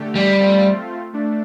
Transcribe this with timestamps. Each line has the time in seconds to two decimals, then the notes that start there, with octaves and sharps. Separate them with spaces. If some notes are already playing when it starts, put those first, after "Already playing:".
Already playing: D3 A3 G4
0.15 G3
0.40 A3 C4 F4
1.13 A3 D4